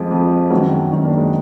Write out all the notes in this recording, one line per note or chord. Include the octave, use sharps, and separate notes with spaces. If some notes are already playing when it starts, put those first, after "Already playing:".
Already playing: F2 F3 G#3
F2 F3
F#2 D#3 F#3 G#3 B3
G#3
F#2 D#3 F#3
A#3 D4
G#3